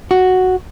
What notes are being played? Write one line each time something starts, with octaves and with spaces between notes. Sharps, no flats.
F#4